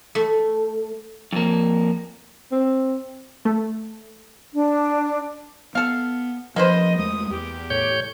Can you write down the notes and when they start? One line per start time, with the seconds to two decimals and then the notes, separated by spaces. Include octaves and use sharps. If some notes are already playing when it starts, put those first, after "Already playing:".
0.15 A3
1.32 F2 A#3
2.52 C4
3.45 A3
4.53 D4
5.75 B3 A4 F5
6.56 F3 A#3 C#4 B4 C5 D#5
6.98 E2 G#3 A3 D#6
7.30 E2 G4
7.70 A2 C#5 G6